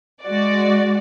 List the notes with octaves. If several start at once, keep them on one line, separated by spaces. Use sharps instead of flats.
G#3 F#4 D5